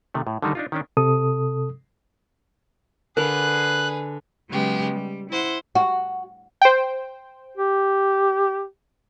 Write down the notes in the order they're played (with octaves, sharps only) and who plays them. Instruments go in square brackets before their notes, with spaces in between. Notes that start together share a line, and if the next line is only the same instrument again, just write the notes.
[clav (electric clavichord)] C3 D#3 A3
A2
D3 D#3 G3 D#4
D4 D#4 F4
D#3 C#4 D4
[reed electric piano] C3 A4 D#6
[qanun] D3 F5 D6 [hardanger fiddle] G#4 B4 [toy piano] A#4 [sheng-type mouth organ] F#6
[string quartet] C#3 F#3 G#3 B3 G4
G3
E4 C5 F#5
[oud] F#4
[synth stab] C5 G5
[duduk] G4